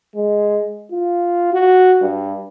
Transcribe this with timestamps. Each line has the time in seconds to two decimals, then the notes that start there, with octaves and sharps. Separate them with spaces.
0.15 G#3
0.92 F4
1.53 F#4
2.02 G2